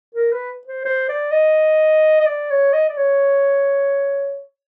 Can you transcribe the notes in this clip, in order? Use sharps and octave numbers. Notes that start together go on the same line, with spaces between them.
A#4
B4
C5
C5
D5
D#5
D#5
D5
C#5
D#5
D5
C#5